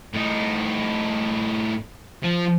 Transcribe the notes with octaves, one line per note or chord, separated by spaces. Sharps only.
A2 D#4
F3